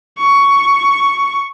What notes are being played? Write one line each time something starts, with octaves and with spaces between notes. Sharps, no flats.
C#6